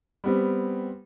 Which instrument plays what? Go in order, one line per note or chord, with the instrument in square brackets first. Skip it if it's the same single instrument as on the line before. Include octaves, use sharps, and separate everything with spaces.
[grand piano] G3 B3 C4